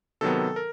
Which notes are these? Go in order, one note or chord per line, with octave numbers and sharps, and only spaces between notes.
C3 D#3 F#3 B3 A4
A#4